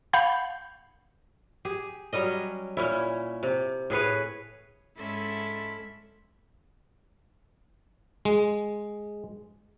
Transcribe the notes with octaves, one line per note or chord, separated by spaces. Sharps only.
F5 F#5 B5 G6
G4 G#4
F#3 G3 C#4 D#5
A#2 C#4 E4
C3
A2 G#4 B4 C#5
G#2 C#4 E4 A4 E5 C6
G#3